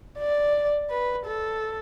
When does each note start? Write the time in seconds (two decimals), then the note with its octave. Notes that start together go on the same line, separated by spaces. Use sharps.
0.18 D5
0.90 B4
1.25 A4